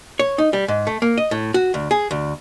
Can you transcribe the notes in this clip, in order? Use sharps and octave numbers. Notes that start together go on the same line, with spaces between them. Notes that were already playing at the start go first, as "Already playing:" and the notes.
C#5
D#4
G3
G#2
A3
A#3
D#5
A2
F#4
D2
G#4
D2